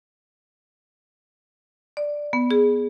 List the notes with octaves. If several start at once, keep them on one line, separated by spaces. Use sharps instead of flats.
D5
B3
G#4